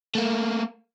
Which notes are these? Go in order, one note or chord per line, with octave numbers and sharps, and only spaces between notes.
A3 A#3